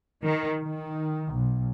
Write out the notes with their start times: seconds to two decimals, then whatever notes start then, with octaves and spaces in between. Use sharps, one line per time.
0.23 D#3
0.63 D#3
1.37 B1